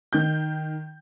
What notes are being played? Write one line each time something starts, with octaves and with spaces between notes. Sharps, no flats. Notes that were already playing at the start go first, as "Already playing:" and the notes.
D#3 G6